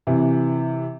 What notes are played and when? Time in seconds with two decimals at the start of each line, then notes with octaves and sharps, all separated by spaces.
0.07 C3 E3